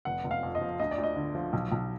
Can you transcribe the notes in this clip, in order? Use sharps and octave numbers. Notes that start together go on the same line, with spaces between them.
F1 F#5
F1
F5
F2
D#5
F3
D2 D#5
D5
D2
D#5
D3
F3
B1
B1